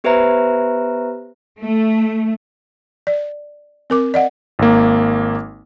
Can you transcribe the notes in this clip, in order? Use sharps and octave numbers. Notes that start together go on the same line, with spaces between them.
B3 G4 B4 C5 E5 A#5
A3
D5
C4 A#4 D6
D5 D#5 F#5
G#1 A#3